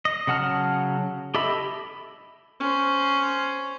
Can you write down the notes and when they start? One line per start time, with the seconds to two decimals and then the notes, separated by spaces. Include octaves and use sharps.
0.05 D#5
0.27 C#3 F#3 F#5 A5 F6
1.34 G4 A4 D#5 E5 B5
2.60 C#4 C5